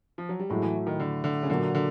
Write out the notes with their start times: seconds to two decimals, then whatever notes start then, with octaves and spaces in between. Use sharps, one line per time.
0.18 F3
0.29 F#3
0.40 G3
0.50 A2 F#3 G#3 A3
0.62 E3
0.87 D#3
1.00 D3
1.24 D3
1.43 C#3
1.50 A#2 D3 F#3 A#3
1.75 D3